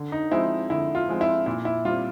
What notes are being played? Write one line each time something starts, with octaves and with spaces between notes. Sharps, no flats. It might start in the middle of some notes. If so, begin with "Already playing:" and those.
Already playing: D3
D#4
F3 G#3 C4 E4
D3 E4
F4
F3 G#3 C4
E4
A#2 E4
E4
G3 C4 F4